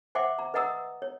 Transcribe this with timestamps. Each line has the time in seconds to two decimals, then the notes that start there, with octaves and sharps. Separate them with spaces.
0.15 C5 E5 F#5 G5 C6 D6
0.39 A#5
0.54 B4 D#5 F#5 A#5 D#6 E6
1.02 C#5